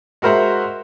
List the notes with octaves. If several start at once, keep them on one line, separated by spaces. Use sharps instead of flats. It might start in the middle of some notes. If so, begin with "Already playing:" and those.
G#3 F#4 A#4 C5 E5 F#5